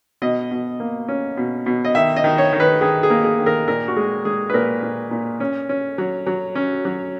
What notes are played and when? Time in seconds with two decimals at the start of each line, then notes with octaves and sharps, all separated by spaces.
0.22 B2 D#5
0.51 B2
0.80 A#3
1.08 C#4
1.37 B2
1.66 B2
1.85 D#5
1.95 D#3 E5
2.16 D#5
2.24 D#3
2.38 C#5
2.53 D#3
2.60 B4
2.81 D#3 G#4
3.03 G#4
3.10 A#3
3.24 G#4
3.39 D#3
3.46 A#4
3.68 A#2 A#4
3.88 F#4
3.96 G#3 G#4
4.25 G#3 G#4
4.50 B4
4.54 A#2 A#4
4.83 A#2
5.11 A#2
5.40 C#4
5.69 C#4
5.98 F#3
6.26 F#3
6.55 C#4
6.85 F#3